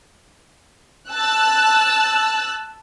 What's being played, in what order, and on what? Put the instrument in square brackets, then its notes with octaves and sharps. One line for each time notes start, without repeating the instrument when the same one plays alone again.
[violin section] A5 E6 F#6